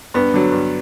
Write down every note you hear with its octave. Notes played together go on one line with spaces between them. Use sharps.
G2 B3
D3 F#3
G2